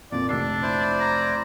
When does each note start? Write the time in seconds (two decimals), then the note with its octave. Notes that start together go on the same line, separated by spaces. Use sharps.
0.12 F2 A#2 D5
0.29 F1 D4 E6 C7
0.62 E4 C5 D5
1.00 A#5